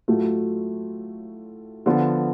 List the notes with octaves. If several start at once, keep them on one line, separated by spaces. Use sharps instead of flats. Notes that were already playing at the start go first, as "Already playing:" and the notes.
A2 F#3 A3 F4
D3 F3 B3 F4